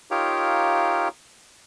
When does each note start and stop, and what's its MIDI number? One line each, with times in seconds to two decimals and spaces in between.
0.11 1.08 63
0.11 1.08 65
0.11 1.08 67
0.11 1.08 70
0.11 1.08 73
0.11 1.08 77